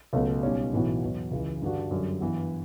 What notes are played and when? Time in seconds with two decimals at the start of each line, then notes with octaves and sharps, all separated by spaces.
0.13 C#2 B2 F#3 A3 C#4
0.43 B1 B2 G3 C#4
0.73 B1 A2 E3 B3 F#4
1.03 E2 B2 F#3
1.31 C#2 C#3 E3
1.62 G2 D3 G3 D4 F#4
1.91 F#2 D3 G3
2.21 G2 E3 B3